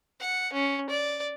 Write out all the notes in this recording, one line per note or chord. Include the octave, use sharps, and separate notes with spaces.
F#5
C#4
D5